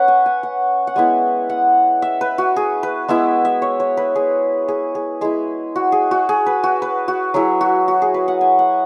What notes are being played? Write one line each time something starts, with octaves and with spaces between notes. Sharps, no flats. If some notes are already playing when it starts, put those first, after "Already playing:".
Already playing: C#4 B4 C#5 F#5
G#5
G#5
F#5
F#5
G#3 B3 E4 G#5
F#5
E5
B4
F#4
G#4
B4
G#3 B3 E4 E5
E5
C#5
C#5
B4
G#4
G#4
G#4
G#3 E4 G#4
F#4
G#4
F#4
G#4
B4
F#4
B4
F#4
F#3 E4 G#4
F#4
F#4
G#4
B4
F#5
G#5
F#5